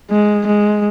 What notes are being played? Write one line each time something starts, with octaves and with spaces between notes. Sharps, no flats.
G#3
G#3